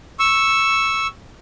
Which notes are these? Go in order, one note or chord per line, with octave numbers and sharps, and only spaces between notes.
C#6 E6